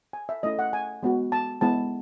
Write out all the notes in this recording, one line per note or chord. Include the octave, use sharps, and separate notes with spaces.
G#5
E5
A3 C#4 E4 D#5
F#5
G#5
G#3 B3 F#4
A5
G#3 B3 E4 A5